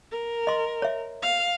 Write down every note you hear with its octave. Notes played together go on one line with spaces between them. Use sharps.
A#4
D#5 C6
C#5 E5
F5